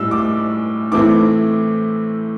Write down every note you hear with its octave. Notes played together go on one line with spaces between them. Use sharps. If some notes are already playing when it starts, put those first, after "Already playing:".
Already playing: A2 G3 E6
D6
A2 E3 A3 C4 E4 D6